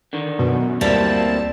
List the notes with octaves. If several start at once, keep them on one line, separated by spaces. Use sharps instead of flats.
D3 D#3
F#2 B2
D2 G3 A#3 C4 E4 A5